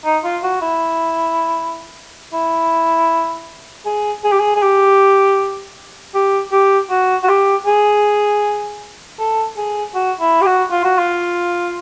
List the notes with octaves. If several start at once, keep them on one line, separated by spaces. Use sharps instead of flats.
D#4
F4
F#4
E4
E4
G#4
G#4
G4
G#4
G#4
G4
G4
G4
F#4
F#4
G4
G#4
A4
G#4
F#4
E4
G4
F#4
F4
F#4
F4